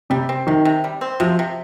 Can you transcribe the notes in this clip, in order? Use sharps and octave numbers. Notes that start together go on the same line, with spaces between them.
C3 G3
C4
C3 D#3
C3
G3
C4
C3 F3
C3